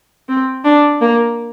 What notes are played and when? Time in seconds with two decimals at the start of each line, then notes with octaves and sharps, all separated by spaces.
0.29 C4
0.64 D4
1.01 A#3